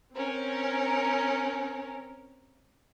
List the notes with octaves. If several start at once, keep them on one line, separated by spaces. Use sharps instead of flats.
C4 C#4 A#4